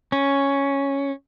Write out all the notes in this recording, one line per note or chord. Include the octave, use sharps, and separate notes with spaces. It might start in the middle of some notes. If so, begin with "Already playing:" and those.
C#4